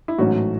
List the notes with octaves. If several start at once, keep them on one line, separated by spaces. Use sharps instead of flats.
E4
A1 G#2 F#3 A3 C#4 F#4